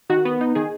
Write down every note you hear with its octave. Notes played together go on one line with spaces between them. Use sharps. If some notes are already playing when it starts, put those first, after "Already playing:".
D#3 F#4
B3
D#4
D#3 G#4